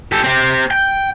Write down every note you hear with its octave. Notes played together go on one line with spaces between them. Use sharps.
G4 A4
C4 G4
G5